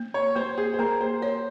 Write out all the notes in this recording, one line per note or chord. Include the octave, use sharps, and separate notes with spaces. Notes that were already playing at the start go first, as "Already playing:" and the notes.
Already playing: A#3
C#5
A#3 C5
G#4
C5
A#3 A#4
C5
C5 C#5